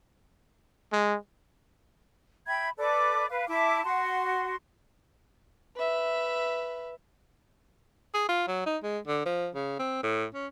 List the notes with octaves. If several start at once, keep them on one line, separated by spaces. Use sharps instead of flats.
G#3
E5 G5 B5 G#6
A4 B4 D5 D6
B4 F5
E4 E5 A5 D6
F#4 F#5 C6
B4 E5
G#4
F4
F#3
D#4
G#3
D3
F3
C#3
C4
A2
C#4